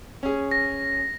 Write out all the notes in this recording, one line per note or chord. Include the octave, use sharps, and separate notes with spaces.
C#4 G#4
A#6